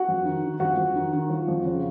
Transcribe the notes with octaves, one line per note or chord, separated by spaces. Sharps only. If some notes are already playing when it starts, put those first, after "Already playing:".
Already playing: F#4 F#5
F2
D#3
D#3
F2 F#4 F#5
F2
D#3
D#3
F3
F2
C#3